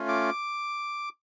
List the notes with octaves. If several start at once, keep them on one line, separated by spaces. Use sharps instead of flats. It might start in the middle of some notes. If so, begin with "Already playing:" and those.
Already playing: A3 C#4 F4
D6